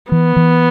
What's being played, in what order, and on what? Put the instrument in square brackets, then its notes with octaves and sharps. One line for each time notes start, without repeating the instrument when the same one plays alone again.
[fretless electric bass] E3 [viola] B3
[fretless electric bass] E3